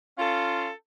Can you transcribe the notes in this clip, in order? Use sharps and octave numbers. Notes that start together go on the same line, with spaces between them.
C#4 F4 A4 F5